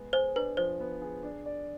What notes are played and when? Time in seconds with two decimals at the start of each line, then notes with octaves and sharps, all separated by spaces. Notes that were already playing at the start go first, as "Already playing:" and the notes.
Already playing: G#3 B3
0.13 G#4 C5
0.36 D4 B4
0.57 F3 C5
0.80 B3
1.02 G#4
1.23 D4
1.45 D5